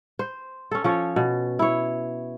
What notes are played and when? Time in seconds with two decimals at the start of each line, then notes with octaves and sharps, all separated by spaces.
0.19 C5
0.71 C#4 A4
0.84 F3 C#4 C#5
1.16 B2
1.59 E4 C#5